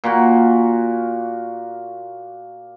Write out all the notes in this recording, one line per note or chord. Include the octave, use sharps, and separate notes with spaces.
A#2 A#3 F#4